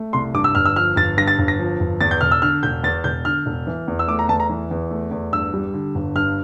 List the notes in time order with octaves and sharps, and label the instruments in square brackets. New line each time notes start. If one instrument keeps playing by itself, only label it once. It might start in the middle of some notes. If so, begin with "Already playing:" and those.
Already playing: [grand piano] A3
C2 C6
G2 D6
E6
G1 F6
E6
F3 F6
G1 A6
G2 A#6
A6
G1
A#6
F3
G1
E2 A6
G6
E1 F6
E6
D3 F6
E1 G6
E2 A6
E1 G6
D3 F6
E1
E3
E2
E6
A3 D6
A#5
E2 A5
A#5
E3
E2
A3
E2
G2 E6
G3
D3
G1
G2 F6